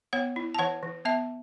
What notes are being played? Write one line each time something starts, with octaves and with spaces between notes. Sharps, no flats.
B3 C#5 F#5
E4
A5
E3 C#5 F#5
E3
B3 E5 A5